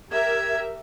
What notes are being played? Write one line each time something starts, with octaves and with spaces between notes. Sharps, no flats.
G4 A#4 E5 G#6